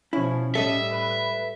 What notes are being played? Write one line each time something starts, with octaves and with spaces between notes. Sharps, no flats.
B2 F3 C#4 E4
A2 G3 A4 D#5 E5
B4